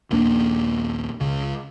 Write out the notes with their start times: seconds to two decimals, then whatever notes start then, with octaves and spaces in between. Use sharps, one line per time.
0.10 A#1 D#2 A#3 D4
1.20 C#2 C#3